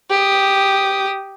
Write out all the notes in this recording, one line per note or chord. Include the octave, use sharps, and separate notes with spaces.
G4 D#6